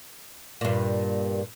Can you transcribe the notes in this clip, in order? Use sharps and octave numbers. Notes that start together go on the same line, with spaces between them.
G2 A#2